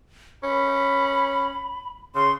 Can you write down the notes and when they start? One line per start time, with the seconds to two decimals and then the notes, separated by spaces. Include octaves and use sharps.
0.43 C#4 B5
2.15 C#3 C6